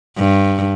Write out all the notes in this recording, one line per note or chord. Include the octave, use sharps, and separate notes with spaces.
G2